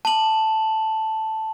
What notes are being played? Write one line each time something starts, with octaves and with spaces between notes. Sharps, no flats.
A5 F#7